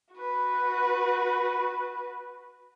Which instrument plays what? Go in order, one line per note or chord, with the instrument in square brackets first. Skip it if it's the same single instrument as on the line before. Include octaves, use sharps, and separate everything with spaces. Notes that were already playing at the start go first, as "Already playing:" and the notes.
[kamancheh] F#4 B4